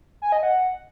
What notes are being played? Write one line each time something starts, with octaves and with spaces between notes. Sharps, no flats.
G#5
D#5
F#5